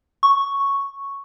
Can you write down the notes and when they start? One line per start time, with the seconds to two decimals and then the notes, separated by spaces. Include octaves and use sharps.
0.23 C#6